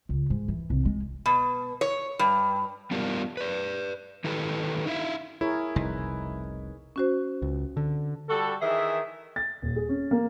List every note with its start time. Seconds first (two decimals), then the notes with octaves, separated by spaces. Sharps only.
0.09 C#2
0.30 G#2
0.48 E3
0.70 C2
0.85 G#3
1.26 B2
1.81 C#5
2.19 G2
2.91 G3 B3 D4 F4 G4 A#4
3.37 B4 D5
4.24 D#3 E4 G4 A4 B4
4.86 D#4 E4 C#5 E5 F5
5.41 E4 G#4 A#4 C#5
5.76 F1 C2 B2 D#4 B4
6.96 C#4 F#4 C5
7.42 C#2
7.77 D3
8.29 G3 F#4 A4
8.60 D#3 E3 G#4 E5
9.36 A6
9.62 D#1
9.76 G#4
9.89 C#4
10.11 A#3